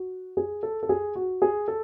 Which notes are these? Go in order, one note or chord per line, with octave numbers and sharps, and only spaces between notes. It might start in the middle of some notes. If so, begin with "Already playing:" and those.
Already playing: F#4
G#4
A4
A4
G#4
F#4
G#4
A4